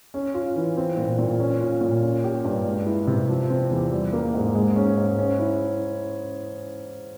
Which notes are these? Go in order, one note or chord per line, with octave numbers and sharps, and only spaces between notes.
C#4
F4
E3
C4
A#2
A#2
C#4
F4
A#2
C#4
G4
G2
G#3
E4
C3
F3
C4
E2
G3
A#3
G#2
G#3
C#4
G#2
C#4
E4